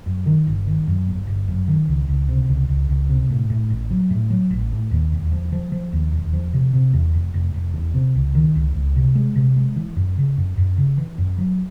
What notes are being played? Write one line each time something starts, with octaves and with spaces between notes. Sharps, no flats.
F#2
D#3
G1
D#3
F#2
G1
G1
F#2
D#3
C#2
C#2
C3
C#2
C#2
C#2
C3
A2
A2
A1
F#3
A2
F#3
A1
A2
D#2
E1
F3
F3
F3
D#2
E1
F3
C3
C3
E2
F1
F1
F1
E2
C3
C#2
D#3
C#2
C#2
C3
G#3
C3
G#3
E3
F#2
C#3
F#2
F#2
C#3
E3
F#2
F#3